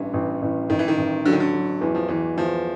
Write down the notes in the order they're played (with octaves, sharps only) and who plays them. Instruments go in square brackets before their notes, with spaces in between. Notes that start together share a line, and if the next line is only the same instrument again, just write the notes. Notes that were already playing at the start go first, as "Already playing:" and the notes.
Already playing: [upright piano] A1 G2 [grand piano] E3
[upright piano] A1
A1
[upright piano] A1 [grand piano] D#3
[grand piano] E3
D#3
[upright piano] A1
[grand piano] D3 [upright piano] F#3
[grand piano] D#3
D3
[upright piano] F#3
[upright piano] E2 [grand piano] E3
[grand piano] F3
[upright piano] E2 [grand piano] E3
[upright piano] E2 [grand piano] F3